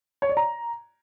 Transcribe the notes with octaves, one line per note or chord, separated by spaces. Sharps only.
C#5
D5
A#5